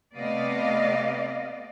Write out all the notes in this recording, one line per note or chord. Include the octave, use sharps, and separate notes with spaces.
C3 A3 B3 D5 D#5 F5